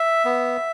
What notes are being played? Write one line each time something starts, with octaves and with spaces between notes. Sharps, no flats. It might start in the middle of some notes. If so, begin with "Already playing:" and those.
Already playing: E5
B3